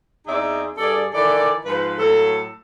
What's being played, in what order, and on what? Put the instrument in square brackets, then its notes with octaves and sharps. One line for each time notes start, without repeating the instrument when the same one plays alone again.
[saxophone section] E2 C4 D#4 G#4 D5 E5
G2 G#4 A4 D5
D#3 E3 A4 D5
G#2 F3 F4 B4
A2 F#3 A#3 A4